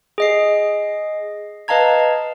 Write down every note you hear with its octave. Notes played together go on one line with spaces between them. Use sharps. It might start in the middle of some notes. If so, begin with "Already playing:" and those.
G#4 D#5 C7
B4 D#5 F5 A5 A#5 G#6